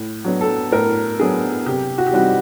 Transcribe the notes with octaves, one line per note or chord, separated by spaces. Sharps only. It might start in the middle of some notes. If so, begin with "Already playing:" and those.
Already playing: A2
F#3 B3 D4
A4
A2 A#4
F#3 B3 D4 G#4
C3 G4
F#4
G4
E3 G3 C4 D#4 F#4